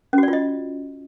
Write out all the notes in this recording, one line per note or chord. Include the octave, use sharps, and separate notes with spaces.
C#4
F#4
D5
F4
D#5